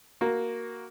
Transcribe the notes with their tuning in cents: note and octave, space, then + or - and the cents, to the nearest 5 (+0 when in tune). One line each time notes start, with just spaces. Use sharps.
A#3 +0 F#4 +5